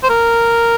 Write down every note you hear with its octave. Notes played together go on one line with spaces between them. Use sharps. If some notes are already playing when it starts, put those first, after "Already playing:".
C5
A#4